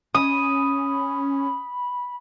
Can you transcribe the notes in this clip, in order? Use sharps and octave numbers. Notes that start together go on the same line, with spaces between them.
C#4 B5 D#6